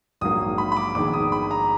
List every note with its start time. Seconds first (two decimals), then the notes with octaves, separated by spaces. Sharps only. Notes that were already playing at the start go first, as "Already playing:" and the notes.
0.21 A#1 G#2 F#3 A#3 D#6
0.58 B5
0.72 B5
0.77 D6
0.95 A#1 G#2 D#3 G#3 B3 D6
1.13 D#6
1.32 B5
1.51 A#5